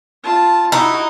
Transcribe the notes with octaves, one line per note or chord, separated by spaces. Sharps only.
F4 A5
D#4 E4 F#4